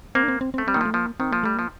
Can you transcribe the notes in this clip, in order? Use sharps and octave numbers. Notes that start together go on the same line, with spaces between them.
A#3 C4
D4
C4
C4
C4
A3
G3 C4
D#3 A#3
F3
A3
F3 A#3
D#3 C4
F3 A#3
G3 A3
F3 A#3